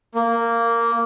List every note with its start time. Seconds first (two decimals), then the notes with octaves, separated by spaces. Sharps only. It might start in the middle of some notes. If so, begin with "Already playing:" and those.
0.15 A#3